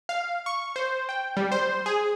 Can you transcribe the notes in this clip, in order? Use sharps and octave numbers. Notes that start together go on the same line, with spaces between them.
F5
C#6
C5
G5
G3
C5
G#4